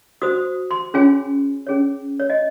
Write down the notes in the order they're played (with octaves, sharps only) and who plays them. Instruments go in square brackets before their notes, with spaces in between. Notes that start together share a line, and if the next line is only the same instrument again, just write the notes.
[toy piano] F#4 C5 D#6
C6
C#4 F4 G#4 C#5 G#5
C#4 G#4 C#5
C#5
D#5